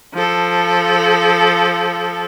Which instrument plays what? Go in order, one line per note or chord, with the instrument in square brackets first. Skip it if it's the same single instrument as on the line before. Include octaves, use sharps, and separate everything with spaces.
[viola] F3 A4